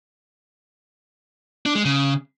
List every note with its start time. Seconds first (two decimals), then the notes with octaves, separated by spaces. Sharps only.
1.66 D4
1.75 G#3
1.85 C#3